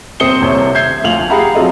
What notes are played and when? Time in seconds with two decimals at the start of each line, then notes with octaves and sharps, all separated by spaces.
0.20 D#1 C4 C5 D#6 C#7 G7
0.41 D#1 C2 C3 C#5
0.74 E5 G6 G#6 C7
1.03 D2 F3 F5 F7 F#7
1.30 G4 G#4 F5 F#5 A#5 B5
1.55 F3 F#3 C4 A4 D#5